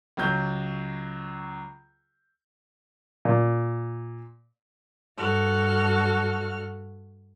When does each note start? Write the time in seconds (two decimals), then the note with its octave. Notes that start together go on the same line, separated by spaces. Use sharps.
0.17 C#2 F#3 G6
3.25 A#2
5.17 G2 F#4 A4 F6